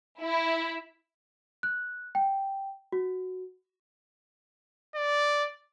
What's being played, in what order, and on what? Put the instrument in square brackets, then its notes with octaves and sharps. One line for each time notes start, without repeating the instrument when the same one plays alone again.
[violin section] E4
[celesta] F#6
G5
F#4
[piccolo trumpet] D5